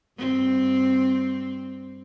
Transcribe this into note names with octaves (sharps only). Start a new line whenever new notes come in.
G2 C4